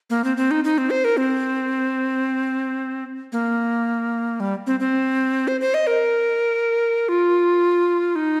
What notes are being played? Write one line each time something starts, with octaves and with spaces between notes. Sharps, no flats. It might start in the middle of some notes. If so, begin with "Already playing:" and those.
A#3
C4
C4
D#4
D#4
C4
C5
A#4
C4
A#3
G3
C4
C4
C5
C5
D#5
A#4
F4
D#4